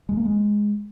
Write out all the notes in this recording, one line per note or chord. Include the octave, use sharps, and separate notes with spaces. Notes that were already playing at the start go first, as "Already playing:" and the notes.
G#3
A#3
G#3